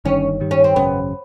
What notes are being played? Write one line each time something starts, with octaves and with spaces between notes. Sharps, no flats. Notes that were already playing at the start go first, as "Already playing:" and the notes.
G1 G2 D#3 C#4
G2 D#3 G3
C#4
C4
G#1 F#2 C#3 B3